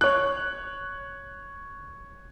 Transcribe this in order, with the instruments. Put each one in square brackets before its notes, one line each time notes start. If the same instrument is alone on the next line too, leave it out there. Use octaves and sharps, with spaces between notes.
[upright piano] C#5 F#6